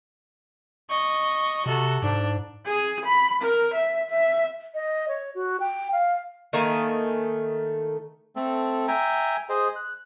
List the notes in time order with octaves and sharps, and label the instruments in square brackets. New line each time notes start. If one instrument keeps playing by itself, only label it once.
[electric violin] D#5 C#6
[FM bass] C3 [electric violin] F#4 A4
[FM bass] G#2 [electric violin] D4
[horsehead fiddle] G#4
B5
A#4
E5
E5
[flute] D#5
C#5
F#4
G5
F5
[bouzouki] D#3 A3 A#3 G#5
[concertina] A3 C4 A4
E5 G5 G#5 A#5
G#4 C5 D#5
F#6